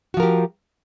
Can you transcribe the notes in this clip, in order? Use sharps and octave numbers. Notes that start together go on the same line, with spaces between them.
F3 F#4 G4 A#4